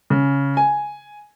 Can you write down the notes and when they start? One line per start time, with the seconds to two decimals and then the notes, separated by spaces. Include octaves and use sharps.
0.10 C#3
0.57 G#5